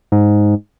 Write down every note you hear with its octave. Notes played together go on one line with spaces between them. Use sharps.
G#2